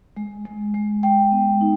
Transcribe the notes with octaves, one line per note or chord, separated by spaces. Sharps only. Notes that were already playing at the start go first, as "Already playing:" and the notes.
G#3
G#3
G#3
G#3 G5
B3
D#4